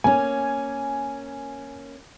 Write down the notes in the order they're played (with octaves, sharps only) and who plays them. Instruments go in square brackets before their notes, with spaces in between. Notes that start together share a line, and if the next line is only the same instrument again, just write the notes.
[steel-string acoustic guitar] A#3 C#4 [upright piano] G#5